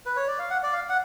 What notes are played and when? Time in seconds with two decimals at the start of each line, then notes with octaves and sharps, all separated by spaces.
0.06 B4
0.16 C#5
0.28 D5
0.39 F5
0.50 F#5
0.63 D5
0.73 F5
0.89 F#5